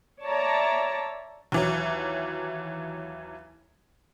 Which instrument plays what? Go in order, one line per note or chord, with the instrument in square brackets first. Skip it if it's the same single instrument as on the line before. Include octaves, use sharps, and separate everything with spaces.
[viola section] C#5 D5 E5 A5 A#5
[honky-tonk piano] D#2 E3 F#3